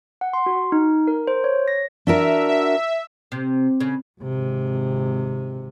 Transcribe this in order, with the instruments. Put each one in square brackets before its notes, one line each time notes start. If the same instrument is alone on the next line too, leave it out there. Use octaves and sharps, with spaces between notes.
[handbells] F#5
C6
F#4
D#4
A#4
C5
C#5
A#6
[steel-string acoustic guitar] D4 F#4 A#4 [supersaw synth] E5
[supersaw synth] E5
[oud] C3
C#3
[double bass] G#1 C3